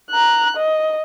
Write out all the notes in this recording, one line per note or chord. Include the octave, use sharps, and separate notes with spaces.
A#5 F#6
D#5